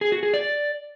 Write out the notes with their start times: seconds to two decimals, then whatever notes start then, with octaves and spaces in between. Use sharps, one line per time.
0.01 G#4
0.12 F#4
0.23 G#4
0.34 D5